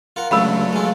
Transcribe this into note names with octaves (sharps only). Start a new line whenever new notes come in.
F4 A#4 F#5
C#2 D3 F#3 A3 F5 B5 E6
G#3 F4